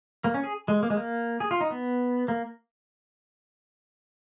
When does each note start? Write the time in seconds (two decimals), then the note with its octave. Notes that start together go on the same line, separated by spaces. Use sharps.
0.24 A#3
0.34 C#4
0.44 G#4
0.68 G#3
0.83 A#3
0.90 G#3
0.97 A#3
1.40 G#4
1.51 F4
1.61 D#4
1.70 B3
2.28 A#3